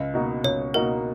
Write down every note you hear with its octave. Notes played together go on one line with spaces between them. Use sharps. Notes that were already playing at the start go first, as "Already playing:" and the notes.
Already playing: C#2 D#5
B2 A#3 D#4 F#4
C#2 C#5
B2 A#3 D#4 F#4 A#4